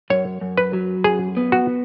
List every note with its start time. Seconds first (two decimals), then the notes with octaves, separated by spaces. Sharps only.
0.10 F#2 C#5
0.41 F#2
0.58 B4
0.73 F#3
1.04 F#2 G#4
1.37 B3
1.52 F#4